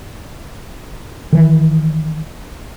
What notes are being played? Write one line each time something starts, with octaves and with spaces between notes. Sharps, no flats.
D#3 E3